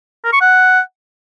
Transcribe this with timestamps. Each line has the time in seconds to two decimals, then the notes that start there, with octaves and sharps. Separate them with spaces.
0.25 A#4
0.33 C#6
0.41 F#5